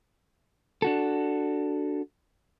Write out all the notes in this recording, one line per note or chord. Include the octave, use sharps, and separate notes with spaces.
D4 F#4 A4